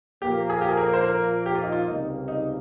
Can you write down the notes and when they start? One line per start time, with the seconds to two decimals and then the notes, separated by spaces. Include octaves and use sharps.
0.22 A#2 F3 A#3 G4
0.49 G#4
0.61 G4
0.69 G#4
0.77 A#4
0.93 C5
1.04 A#4
1.46 G4
1.55 F4
1.63 D#4
1.72 F4
1.86 C#2 C3 G3 A#3 D#4
2.28 D#4